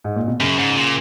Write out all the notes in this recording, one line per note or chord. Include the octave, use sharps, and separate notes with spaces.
G#2
A#2
B2
F#2 C#3
G#2
A#2